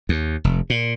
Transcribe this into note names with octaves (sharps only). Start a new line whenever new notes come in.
D#2
F1
A#2